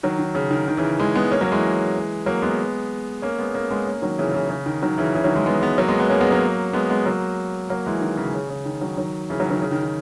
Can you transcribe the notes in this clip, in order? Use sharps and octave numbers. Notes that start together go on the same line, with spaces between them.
D#3 F#3
D#3
C#3
D#3
D#3
C#3 E3
E3 G#3
G#3 B3
A#3 C#4
F#3 A#3
E3 G#3
F#3 A#3
G#3 B3
A#3 C#4
G#3 B3
A#3 C#4
G#3 B3
A#3 C#4
D#3 F#3
C#3 E3
C#3 E3
C#3
D#3
D#3 F#3
C#3 E3
C#3 E3
D#3 F#3
E3 G#3
G#3 B3
G#3 B3
F#3 A#3
G#3 B3
G#3 B3
A#3 C#4
G#3 B3
F#3 A#3
G#3 B3
G#3 B3
F#3 A#3
F#3 A#3
E3 G#3
D#3
C#3
C#3
C#3
D#3
D#3 F#3
D#3 F#3
C#3 E3
D#3 F#3
D#3 F#3
C#3
D#3
D#3